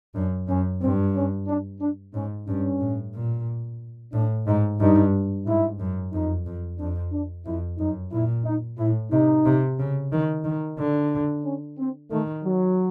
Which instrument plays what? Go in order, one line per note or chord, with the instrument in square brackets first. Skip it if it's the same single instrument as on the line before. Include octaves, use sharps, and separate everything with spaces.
[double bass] F#2 [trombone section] D4
[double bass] F#2 [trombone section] C#4
[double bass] G2 [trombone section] C4
[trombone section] C#4
D4
D4
[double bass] G#2 [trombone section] C#4
[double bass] G2 [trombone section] C#4
[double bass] A2
A#2
[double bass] A2 [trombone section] D4
[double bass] G#2 [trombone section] D#4
[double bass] G2 [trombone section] D#4
[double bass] G#2 [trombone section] E4
[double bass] F#2
[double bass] F2 [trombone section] D#4
[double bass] F2
[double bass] F2 [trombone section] D4
[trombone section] D4
[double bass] F2 [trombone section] E4
[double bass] F#2 [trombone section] D#4
[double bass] A#2 [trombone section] E4
[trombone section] D#4
[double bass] A2 [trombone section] E4
[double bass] C3 [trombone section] D#4
[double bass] C3
C#3
D#3
D#3
[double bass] D3 [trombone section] D4
[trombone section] C#4
C4
[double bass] D#3 [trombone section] A3
[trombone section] F#3